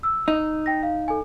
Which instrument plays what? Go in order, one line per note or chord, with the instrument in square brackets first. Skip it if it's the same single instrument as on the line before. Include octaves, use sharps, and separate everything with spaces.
[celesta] E6
[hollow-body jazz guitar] D#4
[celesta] G5 A#6
F5
A4 G#5